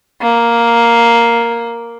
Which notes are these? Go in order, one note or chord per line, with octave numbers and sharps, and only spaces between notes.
A#3